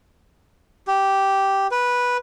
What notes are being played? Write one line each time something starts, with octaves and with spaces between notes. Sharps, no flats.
G4
B4